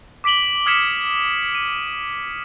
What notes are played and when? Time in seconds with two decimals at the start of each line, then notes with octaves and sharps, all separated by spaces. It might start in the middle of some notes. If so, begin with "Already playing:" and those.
0.24 D6 B6 D7 F#7 G7
0.66 D#6 F6 G#6 B6 C#7 E7
1.55 D#7